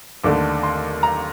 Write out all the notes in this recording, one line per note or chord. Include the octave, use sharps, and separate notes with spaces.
D#2 D3 A3 D4 D6
C6
A#5